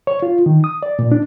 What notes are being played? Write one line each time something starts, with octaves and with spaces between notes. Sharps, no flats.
C#5
F4
D#3
D#6
D5
A#2
D4